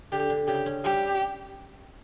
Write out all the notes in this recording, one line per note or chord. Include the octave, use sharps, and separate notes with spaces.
D3 G4
D3
C#3 G4
C#4
G3 G4